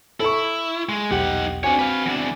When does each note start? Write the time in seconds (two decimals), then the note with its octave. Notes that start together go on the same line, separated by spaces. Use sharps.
0.20 E4 A4 C#6
0.89 G#3
1.11 B1 E2 D#4 G4 F#5
1.64 C4 D4 F#4 C#5 G#5
1.79 B4 F5
2.06 E2 D4